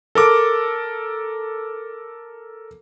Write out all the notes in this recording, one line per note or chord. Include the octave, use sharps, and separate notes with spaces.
A4 A#4 D6